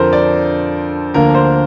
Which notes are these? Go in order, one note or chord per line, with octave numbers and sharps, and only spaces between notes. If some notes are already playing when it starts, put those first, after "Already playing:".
Already playing: F2 D3 F3 A4 A#4 C5
D5
D2 D3 F3 A#3 D4 A#4
C5